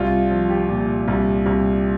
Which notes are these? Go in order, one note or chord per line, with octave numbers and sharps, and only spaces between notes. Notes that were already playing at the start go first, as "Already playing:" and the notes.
Already playing: C2 F4
F3
G4
A#2
C2
C2